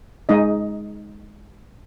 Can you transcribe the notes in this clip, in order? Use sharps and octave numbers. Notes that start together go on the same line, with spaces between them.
G#3 D#4 D#5